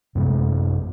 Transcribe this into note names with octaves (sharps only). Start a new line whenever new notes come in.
F#2 C3 G#3